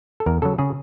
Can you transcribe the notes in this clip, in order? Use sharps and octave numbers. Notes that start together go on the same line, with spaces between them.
A4
E2 A#4
C#3 F#3 A4
C#3 G#4